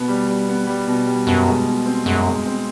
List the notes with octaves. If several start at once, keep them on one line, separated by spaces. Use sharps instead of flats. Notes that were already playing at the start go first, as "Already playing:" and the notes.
Already playing: B2 B3
G3
G3
B3
G3
B2
G3
F#2 B2
G#3
B2
C4
F#2 G#3
G#3
C4